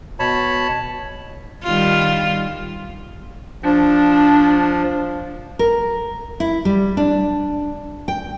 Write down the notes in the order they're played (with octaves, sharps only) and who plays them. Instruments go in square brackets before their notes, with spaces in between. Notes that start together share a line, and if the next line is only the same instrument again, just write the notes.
[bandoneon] B2 C#5 A5 B5
[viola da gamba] D#3 G3 F4
[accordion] F3 [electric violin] D4
[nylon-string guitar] A#4
E4
G3
D4
G5